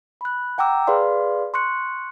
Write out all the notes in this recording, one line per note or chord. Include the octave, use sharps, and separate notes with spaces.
B5 F#6
F#5 G5 A#5 D6 E6
G#4 B4 D5 F5 C6
C6 C#6 F#6 C#7